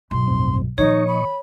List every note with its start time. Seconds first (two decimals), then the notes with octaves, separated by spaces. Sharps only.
0.11 B1 G2 C6
0.28 F2 A2 C4
0.78 A#2 D#3 F3 D#4 C#5 D#5 C#6
1.07 B5